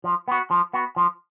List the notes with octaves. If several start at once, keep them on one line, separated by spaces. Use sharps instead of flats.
F3
B3 F#4
F3
B3 F#4
F3